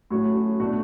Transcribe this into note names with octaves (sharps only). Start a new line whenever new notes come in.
A2 F#3 A3 C#4 F#4
F#4
B2 A3 D4 F#4